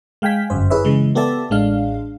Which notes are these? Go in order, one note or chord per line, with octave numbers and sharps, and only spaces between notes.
G#3 F5 G5 G#5 B6
G1 F#2 C5
E4 G#4 B4 C#5 E5
C#3 E3 G#3
B3 G4 A4 D5 E5 A5
A1 G#3 D4 F5